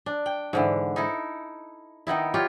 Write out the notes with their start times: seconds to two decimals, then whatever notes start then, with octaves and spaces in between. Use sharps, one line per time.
0.06 D4
0.26 G5
0.53 G#2 D3 E3
0.96 D#4 E4 A4
2.07 D#3 B3 D#4 E4
2.34 F4 G4 C#5